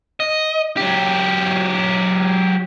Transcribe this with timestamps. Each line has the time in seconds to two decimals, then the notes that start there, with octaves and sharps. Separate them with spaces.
0.20 D#5
0.77 F#3 G4